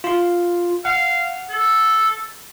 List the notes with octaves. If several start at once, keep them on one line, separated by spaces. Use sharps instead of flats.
F4 C6
F5 F#5
A4